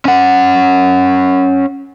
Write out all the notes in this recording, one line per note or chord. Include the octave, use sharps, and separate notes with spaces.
C#4 F#5